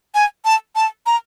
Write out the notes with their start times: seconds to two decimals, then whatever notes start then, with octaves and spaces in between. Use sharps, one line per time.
0.15 G#5
0.45 A5
0.75 A5
1.06 A#5